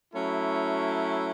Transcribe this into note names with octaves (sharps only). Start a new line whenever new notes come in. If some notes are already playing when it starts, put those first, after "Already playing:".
F#3 A3 C#4 E4